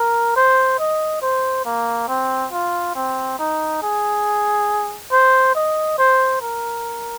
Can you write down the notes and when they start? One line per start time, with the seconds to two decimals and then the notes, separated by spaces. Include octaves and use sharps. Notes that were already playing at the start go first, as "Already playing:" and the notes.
Already playing: A#4
0.36 C5
0.79 D#5
1.22 C5
1.65 A#3
2.08 C4
2.52 F4
2.95 C4
3.39 D#4
3.83 G#4
5.12 C5
5.55 D#5
5.99 C5
6.41 A#4